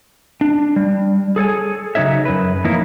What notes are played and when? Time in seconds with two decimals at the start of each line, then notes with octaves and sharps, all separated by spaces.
0.41 D4
0.76 G3
1.36 G#4 A4 C#5 G#5
1.95 C#3 F#3 D#4 C#5 E5
2.25 F#2 B4
2.65 E3 F3 A#3 D#4 E4